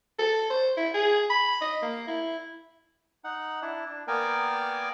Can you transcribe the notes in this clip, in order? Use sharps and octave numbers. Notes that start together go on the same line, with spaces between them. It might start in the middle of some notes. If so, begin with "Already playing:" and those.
A4
C5
E4
G#4
B5
D#5
A#3
E4
D#4 F#5
D4 E4
D4
A#3 B3 A#4 D5 G5 G#5